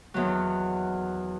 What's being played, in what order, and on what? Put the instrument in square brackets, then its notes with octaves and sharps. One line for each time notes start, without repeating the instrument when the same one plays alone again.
[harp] E2 D#3 F#3